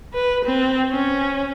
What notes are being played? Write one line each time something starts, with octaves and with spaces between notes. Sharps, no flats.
B4
C4
C#4